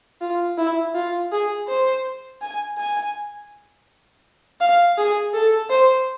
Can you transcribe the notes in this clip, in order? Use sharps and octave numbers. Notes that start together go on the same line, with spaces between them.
F4
E4
F4
G#4
C5
G#5
G#5
F5
G#4
A4
C5